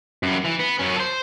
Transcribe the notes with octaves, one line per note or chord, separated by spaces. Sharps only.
F#2 G3
E3
B3
F#2 C#4
A4 C5